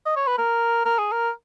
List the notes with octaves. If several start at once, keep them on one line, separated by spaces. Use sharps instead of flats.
D#5
C#5
B4
A#4
A#4
G#4
A#4